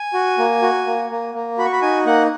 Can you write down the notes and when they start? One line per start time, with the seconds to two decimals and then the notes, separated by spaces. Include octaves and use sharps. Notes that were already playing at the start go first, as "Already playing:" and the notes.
Already playing: G#5
0.14 F#4
0.38 A#3
0.62 F#4
0.87 A#3
1.10 A#3
1.34 A#3
1.58 F#4 B5
1.65 C#6
1.73 B5
1.82 D#4 G#5
2.06 A#3 F#5